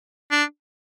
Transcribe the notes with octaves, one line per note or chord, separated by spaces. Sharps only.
D4